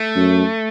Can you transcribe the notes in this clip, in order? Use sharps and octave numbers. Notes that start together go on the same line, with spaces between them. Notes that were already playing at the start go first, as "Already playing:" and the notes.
Already playing: A3
F#2